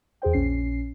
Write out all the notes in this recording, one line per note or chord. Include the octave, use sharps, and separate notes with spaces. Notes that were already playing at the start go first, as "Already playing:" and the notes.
E2 G#4 C5 G5
A#1 C#4 C7